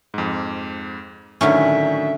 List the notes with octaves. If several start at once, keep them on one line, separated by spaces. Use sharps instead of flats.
F2 G#2
A2 D3 D#3 F#3 C#4 E5